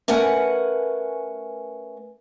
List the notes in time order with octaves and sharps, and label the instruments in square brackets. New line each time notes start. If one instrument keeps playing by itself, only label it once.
[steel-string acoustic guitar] A3 C#4 A#4 B4 F#5 G#5